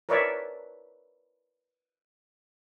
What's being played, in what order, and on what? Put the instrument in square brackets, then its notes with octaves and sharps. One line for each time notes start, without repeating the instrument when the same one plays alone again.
[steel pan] A#4 B4 C#5 D5 E5